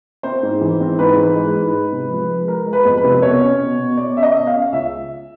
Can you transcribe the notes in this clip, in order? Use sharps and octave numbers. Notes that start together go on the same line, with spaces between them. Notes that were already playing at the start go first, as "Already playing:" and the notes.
C4 C5
G#2
E3
C4
G#2 B4
E3
G#3
G#2
G#3
C3
F3
G#3
G#3 A#4
G#3
B4
F2
B4
C3
B2 C#5
C#4
B2
B2
B2 D5
C#4 E5
D#5
B2
F5
C#4
C#2 E5